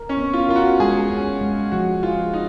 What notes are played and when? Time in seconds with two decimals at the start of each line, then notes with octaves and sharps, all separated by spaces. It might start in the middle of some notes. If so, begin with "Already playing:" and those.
Already playing: A#4
0.09 C#4
0.17 B3
0.33 F4
0.49 F4 A#4
0.56 F#4
0.80 G#3 G#4
1.10 C#4
1.41 G#3
1.72 F3 F#4
2.03 F4 G#4
2.33 D#4